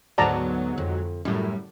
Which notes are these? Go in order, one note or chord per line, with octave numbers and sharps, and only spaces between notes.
D2 G#2 F#3 B3 D5 A5 A#5
F2
F#2 A2 G3